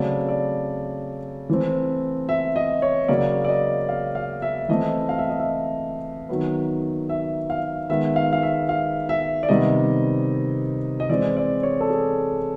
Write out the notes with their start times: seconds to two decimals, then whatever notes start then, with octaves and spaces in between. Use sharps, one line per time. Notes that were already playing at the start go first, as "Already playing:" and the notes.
Already playing: C#3 F#3 A3 C4 D5
0.29 D5
1.49 E3 A3 C4
2.29 E5
2.56 D#5
2.82 C#5
3.08 C#3 F#3 A#3 D5
3.44 D5
3.49 D#5
3.89 F5
4.15 F5
4.42 E5
4.69 E3 A3 C4 D#5
5.09 F5
5.19 E5
5.29 D#5
5.40 E5
6.29 D#3 F#3 B3
7.09 E5
7.50 F5
7.89 D#3 G#3 B3 E5
8.16 F5
8.33 F5
8.43 E5
8.69 F5
9.09 E5
9.43 D5
9.49 C3 D#3 G3 B3 D#5
11.00 D#5
11.09 E3 G#3 C4 D5
11.36 D5
11.63 C#5
11.81 A4
11.90 G#4